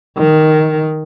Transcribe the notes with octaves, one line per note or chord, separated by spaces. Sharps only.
D#3